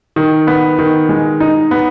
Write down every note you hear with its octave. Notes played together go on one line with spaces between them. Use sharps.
D#3
B3
D#3
G#3
D#4
B3